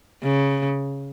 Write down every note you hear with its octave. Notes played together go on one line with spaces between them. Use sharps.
C#3